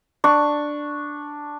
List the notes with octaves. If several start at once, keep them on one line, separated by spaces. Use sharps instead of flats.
D4 C#6